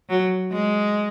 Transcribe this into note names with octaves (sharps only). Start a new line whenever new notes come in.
F#3
G#3